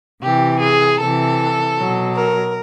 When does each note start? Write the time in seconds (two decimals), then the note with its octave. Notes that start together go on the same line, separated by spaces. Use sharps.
0.22 C3 E3 G4
0.60 G#4
0.99 C3 E3 A4
1.76 B2 F#3
2.15 A#4